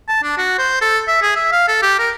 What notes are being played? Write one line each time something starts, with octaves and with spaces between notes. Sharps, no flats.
A5
D4
F#4
C5
A4
E5
G#4
E5
F5
A4
G4
A#4